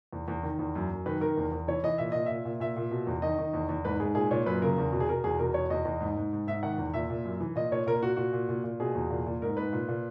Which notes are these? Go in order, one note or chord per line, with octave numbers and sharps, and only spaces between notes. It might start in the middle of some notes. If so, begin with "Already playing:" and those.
E2
E2
D#3
E2
F#2
F#2
D#3 B4
D#3 A#4
E2
E2
E3 C#5
E3 D#5
A#2 E5
A#2 D#5
A#2 E5
A#2
A#2 E5
A#2
B2
E2
D#3 D#5
D#3
E2
E2
G#2 B4
G#2 G#4
A#2 G#4
A#2 C#5
F#2 B4
C#3 A#4
E2
B2
G#4
B2 A#4
E2 G#4
B2 A#4
E2 C#5
E2 D#5
E2
G#2
G#2
G#2
G#2 E5
D#3 F#5
E2
A#2 E5
A#2
F#2
E3
A#2 D#5
A#2 C#5
A#2 A#4
A#2 F#4
A#2 F#4
A#2
A#2
A#2
B2 G#4
E2
A#2
A#2
G#2 A#4
G#2 B4
A#2
A#2